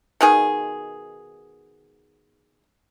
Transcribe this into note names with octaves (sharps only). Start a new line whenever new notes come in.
B2 D#3 G#4